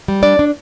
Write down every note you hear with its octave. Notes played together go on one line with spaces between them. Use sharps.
G3
D4 D5
D4